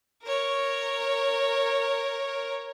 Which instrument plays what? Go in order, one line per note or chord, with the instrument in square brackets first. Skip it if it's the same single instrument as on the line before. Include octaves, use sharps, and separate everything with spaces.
[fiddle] A#4 C#5